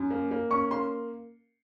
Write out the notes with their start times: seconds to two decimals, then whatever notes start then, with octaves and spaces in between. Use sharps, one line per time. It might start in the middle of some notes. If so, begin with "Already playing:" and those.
Already playing: F#2
0.10 A#3
0.31 A#3
0.51 C#4 C#6
0.71 A#3 C6